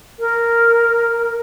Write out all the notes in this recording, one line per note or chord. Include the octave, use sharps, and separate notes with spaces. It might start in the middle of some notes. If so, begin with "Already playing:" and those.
A#4